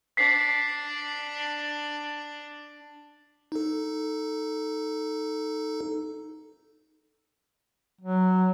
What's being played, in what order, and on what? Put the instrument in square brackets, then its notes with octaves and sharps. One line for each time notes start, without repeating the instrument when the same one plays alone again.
[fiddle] D4 [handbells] B6 C7
[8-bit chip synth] D#4 A4
[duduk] F#3